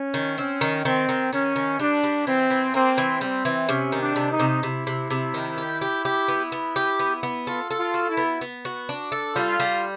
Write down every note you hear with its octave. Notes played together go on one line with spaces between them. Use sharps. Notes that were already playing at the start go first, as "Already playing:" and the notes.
Already playing: C#4
D#3
C4 C#4
D#3
D#3 C4
D#3
D#3 C#4
D#3
G3 D4
G3
E3 C4
E3
A#3 C4
E3
G3 C4
E3
C3 C#4
D#3
D4
C3
D#4
C3
C3 E4
C3
C3
D#3
G4
G4
G4
B3
B3
G4
B3
B3
F4 A4
A4
F4
F#4
E4
B3
B3
F#4
D4
A4
G3 F4
G3